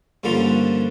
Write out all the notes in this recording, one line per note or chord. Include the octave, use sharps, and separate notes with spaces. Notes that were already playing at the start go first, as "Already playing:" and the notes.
G2 D3 F3 A#3 C#4 F4